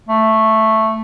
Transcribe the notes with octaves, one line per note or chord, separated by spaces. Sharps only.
A3